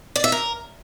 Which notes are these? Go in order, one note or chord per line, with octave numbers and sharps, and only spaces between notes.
D5
E5
A#4